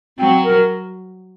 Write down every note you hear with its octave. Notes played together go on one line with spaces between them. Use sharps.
F#3 C4
A#4